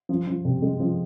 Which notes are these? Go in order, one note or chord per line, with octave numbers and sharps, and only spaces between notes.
F3
F3
C3
G#3
F3